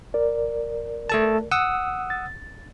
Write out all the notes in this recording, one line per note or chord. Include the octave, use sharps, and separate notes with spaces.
A#4 D5
A3 A4 A5
F#5 D#6 E6
A6